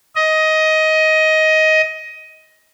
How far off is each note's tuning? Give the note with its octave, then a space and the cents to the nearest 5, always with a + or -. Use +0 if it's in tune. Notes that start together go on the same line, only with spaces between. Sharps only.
D#5 +15